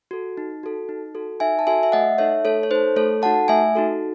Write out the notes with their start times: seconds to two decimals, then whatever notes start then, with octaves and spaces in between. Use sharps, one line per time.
0.11 F#4 A4
0.37 D#4
0.63 F#4 A4
0.89 D#4
1.15 F#4 A4
1.40 D#4 E5 G#5
1.59 A5
1.67 F#4 A4 E5 G#5
1.83 E5
1.92 A3 D#5 F#5
2.18 D#4 A4 C#5 E5
2.45 A3 A4 C#5
2.63 C#5
2.71 D#4 A4 C5
2.96 A3 A4 C#5
3.22 D#4 F#4 A4 F#5 A5
3.48 A3 E5 G#5
3.75 D#4 F#4 A4